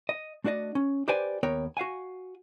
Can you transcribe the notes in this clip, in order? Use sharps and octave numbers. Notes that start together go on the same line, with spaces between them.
D#5
A3 D4 F#4 D5 D#5
C#4
G4 B4 C5 D5 G5 G#5
D#2 B3 A#4 C#5 G5
F#4 F5 F#5 G#5